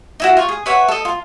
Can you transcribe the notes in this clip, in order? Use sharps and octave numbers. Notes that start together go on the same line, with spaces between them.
D#4 E4 F#4
F4 C#6
G#4
B4 C#5 E5 F#5
A4 D#5
F4